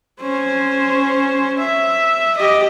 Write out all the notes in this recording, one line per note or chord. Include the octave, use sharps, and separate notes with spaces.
C#4 C5
E5
G4 D#5